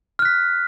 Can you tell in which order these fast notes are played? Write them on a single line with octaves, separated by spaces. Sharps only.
F6 F#6 B6